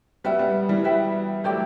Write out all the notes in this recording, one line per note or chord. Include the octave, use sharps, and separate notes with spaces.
G3 B3 F#4 B4 E5 G5
G3 B3
E3 G3
F#4 B4 E5 G5
F#3 A3 E4 G4 D5 G5